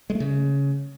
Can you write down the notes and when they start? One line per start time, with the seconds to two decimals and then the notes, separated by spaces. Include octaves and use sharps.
0.10 G#3
0.15 A3
0.20 C#3